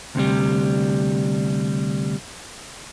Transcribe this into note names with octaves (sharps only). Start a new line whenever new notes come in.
D2 C3 G3